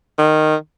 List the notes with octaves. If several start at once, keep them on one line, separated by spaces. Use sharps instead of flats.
D#3